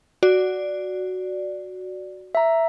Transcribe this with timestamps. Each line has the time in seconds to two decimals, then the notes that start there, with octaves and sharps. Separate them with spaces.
0.23 F#4 D5
2.35 E5 A#5